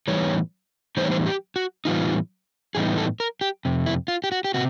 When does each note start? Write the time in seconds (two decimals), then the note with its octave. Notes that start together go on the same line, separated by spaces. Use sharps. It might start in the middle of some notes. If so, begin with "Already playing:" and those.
0.08 A2 E3 G3 B3 D#4 C#5
0.97 A2 E3 G3 B3 D#4 C5
1.04 C#5
1.11 C5
1.26 G4
1.56 F#4
1.85 A2 E3 G3 B3 D#4 F4
2.75 A2 E3 G3 B3 D#4 G#4
2.98 A4
3.20 A#4
3.41 G4
3.65 F2 C3
3.86 E4
4.08 F4
4.24 G4
4.32 F#4
4.45 G4
4.54 C3 F#4